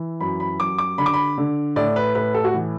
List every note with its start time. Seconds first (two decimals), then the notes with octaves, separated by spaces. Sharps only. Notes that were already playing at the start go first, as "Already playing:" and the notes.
Already playing: E3
0.20 F#2 B5
0.40 B5
0.59 F#2 D6
0.79 D6
0.98 D3 B5
1.06 D6
1.14 B5
1.38 D3
1.76 A2 D5
1.96 B4
2.15 A2 B4
2.34 A4
2.44 F#4
2.54 E3